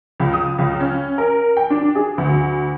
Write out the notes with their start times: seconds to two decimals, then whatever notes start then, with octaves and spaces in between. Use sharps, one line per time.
0.20 C#2
0.34 D#6
0.58 C#2
0.80 C#4
1.18 A#4
1.57 G5
1.70 D4
1.95 G#4
2.18 D2